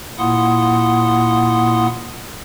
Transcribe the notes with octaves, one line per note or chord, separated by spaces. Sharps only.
A#2 A#3 E4 F#5 C6 D#6